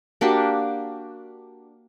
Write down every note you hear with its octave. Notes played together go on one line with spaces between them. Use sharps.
A#3 D4 F#4 G4